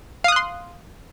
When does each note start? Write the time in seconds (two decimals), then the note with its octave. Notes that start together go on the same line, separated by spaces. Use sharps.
0.24 F5
0.28 D#6
0.32 F#6
0.36 C6